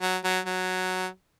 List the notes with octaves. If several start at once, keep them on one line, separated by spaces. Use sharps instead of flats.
F#3
F#3
F#3